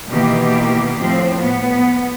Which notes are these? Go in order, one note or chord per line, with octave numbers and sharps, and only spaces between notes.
B2 D#3 E3 A#3 G4
A2 F3 C4
B3